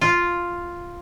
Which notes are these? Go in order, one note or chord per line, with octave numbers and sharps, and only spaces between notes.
F4